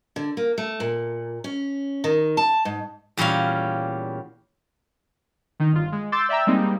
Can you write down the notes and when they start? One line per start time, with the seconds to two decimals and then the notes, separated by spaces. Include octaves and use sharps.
0.16 D3
0.37 A#3
0.58 A3
0.80 A#2
1.44 C#4
2.04 D#3
2.37 A5
2.65 G#2
3.17 E2 A#2 G3 C#4 F5
5.60 D#3 D#4
5.72 G1 F4
5.92 G#3
6.12 C6 D6 E6 G6 A6
6.29 D5 E5 G5 A#5 E6
6.47 G3 G#3 A#3 C4 D#4